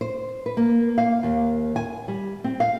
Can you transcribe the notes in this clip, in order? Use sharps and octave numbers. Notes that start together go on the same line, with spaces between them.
C5
B4
A#3
F5
D#2
G#5
G3
C4
F5